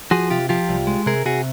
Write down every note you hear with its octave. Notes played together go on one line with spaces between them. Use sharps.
F3 F#4 G#4
C3 F4 G4
F3 F4 G4
C2
G#3
C3 G#4 A#4
C3 F#4 G#4